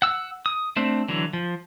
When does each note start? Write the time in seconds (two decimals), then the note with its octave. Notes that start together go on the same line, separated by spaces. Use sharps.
0.02 F#5 E6
0.46 D#6
0.76 A3 C4 D4
1.08 D3 E3 F#3
1.33 F3